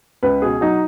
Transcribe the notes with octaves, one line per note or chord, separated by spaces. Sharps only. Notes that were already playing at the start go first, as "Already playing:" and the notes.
C#2 B4
B2 G#4
F#3 D#4